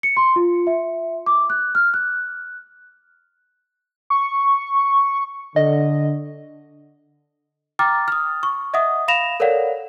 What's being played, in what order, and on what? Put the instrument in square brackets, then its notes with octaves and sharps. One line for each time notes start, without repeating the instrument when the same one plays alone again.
[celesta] C#7
C6
F4
E5
D6
F#6
F6
F#6
[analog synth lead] C#6
[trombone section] D3 [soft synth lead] D#5
[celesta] G5 A#5 D6 F6 A6
D#6 F6
C#6
D#5 E5 F#5 D#6
F5 B5 A#6 E7 F7
A4 A#4 C#5 D5 F5 F#5